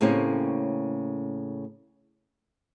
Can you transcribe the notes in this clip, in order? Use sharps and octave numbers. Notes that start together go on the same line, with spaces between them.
A2 C#3 A#3 C4 C#4 G4